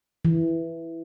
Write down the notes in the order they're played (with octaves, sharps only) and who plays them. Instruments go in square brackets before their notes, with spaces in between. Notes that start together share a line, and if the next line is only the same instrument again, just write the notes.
[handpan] E3